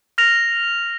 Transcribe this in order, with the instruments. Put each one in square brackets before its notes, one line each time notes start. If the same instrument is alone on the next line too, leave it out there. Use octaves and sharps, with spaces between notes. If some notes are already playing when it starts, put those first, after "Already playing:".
[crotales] F6 A#6 F7